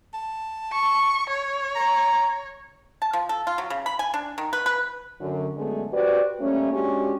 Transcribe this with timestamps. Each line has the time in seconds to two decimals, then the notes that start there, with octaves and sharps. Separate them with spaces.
0.14 A5
0.72 C#6
1.30 C#5
1.75 A#5
3.02 A5
3.13 F3
3.29 A4
3.47 F4
3.58 F#3
3.70 C#3
3.86 B5
3.99 G#5
4.14 D4
4.38 D#3
4.53 B4
4.66 B4
5.20 F#2 D3
5.56 F#2 D3 G#3 A3 B3 G#4
5.93 F#4 G4 B4 C5 D5
6.40 G3 A3 A#3 C#4
6.73 G#3 C#4 D4 F#4 G4